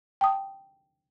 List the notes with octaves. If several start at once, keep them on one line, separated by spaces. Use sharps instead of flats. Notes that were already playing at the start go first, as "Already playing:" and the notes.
G5 A5 D#6